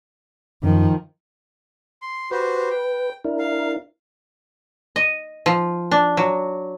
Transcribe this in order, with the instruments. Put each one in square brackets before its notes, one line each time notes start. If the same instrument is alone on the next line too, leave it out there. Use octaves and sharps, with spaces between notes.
[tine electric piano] F#2 [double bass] D#3 F3
[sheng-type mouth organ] C6
[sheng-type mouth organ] F#4 G4 C5 [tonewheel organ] B4
[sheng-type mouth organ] G5
[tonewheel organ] D4 E4 A#4
[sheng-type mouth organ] F5
[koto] D#5
F3
D4
F#3